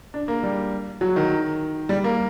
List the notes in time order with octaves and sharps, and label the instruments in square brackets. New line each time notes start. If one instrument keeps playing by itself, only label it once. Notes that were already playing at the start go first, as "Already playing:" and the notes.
[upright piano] D4
A#3
G3
F#3
D#3
G3
A#3